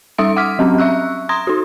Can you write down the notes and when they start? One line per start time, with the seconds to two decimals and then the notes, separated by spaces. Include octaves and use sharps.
0.18 G3 D#4 E5 D#6 E6 D7
0.36 F#5 D6 E6 F6 B6
0.59 F#3 C4 C#4
0.78 E5 C#6 E6 F#6
1.29 A#5 C6 D#6 G#6 A#6
1.47 D#4 F#4